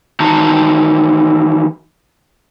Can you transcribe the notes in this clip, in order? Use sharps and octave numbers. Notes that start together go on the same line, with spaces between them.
D#3 E3 D#4 F#4 A5 A#5